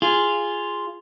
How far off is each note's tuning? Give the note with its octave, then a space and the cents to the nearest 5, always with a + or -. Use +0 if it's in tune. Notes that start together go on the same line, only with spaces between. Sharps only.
F4 -5 G#4 -5